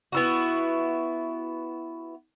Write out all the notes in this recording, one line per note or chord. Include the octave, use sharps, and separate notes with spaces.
B3 E4 F#4